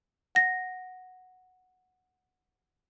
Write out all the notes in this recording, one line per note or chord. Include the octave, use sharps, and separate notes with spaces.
F#5 A#6